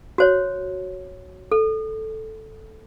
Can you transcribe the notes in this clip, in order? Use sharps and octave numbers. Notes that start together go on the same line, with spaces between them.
F#4 C5 C#5
A4